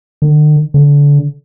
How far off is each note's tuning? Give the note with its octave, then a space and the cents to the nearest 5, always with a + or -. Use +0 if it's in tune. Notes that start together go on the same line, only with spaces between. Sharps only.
D3 +45
D3 -30